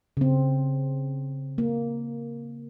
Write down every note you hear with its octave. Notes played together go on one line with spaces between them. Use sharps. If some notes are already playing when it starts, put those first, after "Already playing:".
C#3 C4
A#3